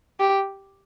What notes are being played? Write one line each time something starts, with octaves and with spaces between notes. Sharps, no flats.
G4